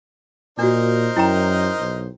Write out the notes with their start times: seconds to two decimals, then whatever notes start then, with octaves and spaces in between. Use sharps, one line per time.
0.59 A#2 D4 D#4 F#4 A#4 C5
1.17 F#2 E4 G5 A#5
1.80 B1